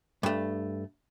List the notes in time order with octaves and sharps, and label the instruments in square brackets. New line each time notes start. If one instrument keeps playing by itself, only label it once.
[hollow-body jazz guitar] G2 A3